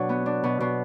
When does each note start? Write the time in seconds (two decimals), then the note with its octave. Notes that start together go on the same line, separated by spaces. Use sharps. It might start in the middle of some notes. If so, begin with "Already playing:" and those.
Already playing: B2 F#3 D4
0.09 B3
0.26 D4
0.44 B2
0.60 B2